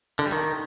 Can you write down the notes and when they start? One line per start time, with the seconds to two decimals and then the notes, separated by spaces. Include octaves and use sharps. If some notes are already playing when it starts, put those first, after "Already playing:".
0.19 D3
0.26 G3
0.32 D#3